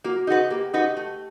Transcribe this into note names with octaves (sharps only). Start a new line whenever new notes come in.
A#3 F#4
D#4 F#4 G#4 B4
A#3 G4
D#4 F#4 B4
A3